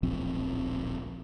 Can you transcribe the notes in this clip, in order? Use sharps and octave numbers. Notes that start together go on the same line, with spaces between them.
D1 A#1 F3 C4